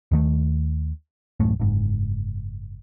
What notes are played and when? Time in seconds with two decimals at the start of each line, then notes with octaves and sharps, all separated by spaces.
0.12 D#2 D#3 A3
1.40 D1 A1 F#2 A3
1.60 F#1 G#2